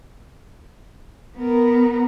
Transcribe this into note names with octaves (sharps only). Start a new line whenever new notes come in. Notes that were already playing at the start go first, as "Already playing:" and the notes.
B3 A#4